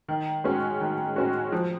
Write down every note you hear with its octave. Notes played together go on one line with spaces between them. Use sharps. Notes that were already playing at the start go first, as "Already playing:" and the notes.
D#3
G#3 C#4 F#4
D#3
G#3 C#4 F#4
F3